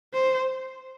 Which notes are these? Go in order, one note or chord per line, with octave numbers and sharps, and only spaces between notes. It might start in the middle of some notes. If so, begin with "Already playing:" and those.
C5